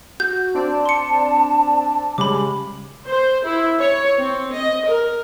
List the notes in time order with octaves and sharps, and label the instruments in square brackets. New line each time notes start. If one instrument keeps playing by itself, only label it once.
[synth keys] F#4 [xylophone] G6
[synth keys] C4 D4 D5 [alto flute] A5
[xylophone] C6 C#7
[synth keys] C#3 G3 G#3 [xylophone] B5 D6
[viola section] C5
E4
C#5
C4
D#5
A#4